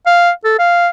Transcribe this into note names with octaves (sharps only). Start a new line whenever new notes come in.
F5
A4
F5